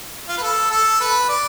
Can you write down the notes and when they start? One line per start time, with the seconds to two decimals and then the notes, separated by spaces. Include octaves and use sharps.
0.28 F4
0.37 B4
0.42 A4
0.71 A4
1.00 B4
1.29 D5